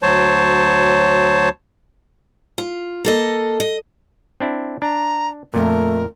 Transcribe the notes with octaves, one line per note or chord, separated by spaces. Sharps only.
D2 F#3 C5 C#5 A5
F4
A#3 A4 D#5
D#5
C4 D4 E4
D4 A#5
F2 A#2 A3 A#4